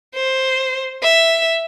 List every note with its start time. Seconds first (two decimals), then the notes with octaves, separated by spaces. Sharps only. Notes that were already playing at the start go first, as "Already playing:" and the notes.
0.15 C5
1.03 E5